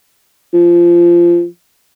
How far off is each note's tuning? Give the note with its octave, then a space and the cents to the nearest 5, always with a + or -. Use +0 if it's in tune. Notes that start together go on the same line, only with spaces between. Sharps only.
F3 -20